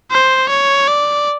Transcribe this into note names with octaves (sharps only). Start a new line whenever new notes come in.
C5
C#5
D5